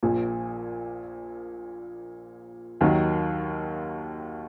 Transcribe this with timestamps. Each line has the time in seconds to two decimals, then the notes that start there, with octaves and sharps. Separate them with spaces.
0.03 A#1 A#2 F3
2.81 D#2 D#3 F#3